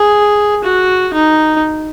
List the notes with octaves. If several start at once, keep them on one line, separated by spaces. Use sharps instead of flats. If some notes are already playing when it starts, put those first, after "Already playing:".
Already playing: G#4
F#4
D#4